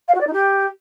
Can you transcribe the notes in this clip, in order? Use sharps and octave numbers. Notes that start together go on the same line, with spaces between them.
F5
F#4
D5
D#4
G4